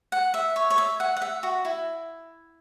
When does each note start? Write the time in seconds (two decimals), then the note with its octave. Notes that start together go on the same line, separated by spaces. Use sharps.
0.12 F#5
0.34 E5
0.56 C#5
0.70 C#5
0.78 E5
1.00 F#5
1.17 F#5
1.22 E5
1.43 F#4
1.65 E4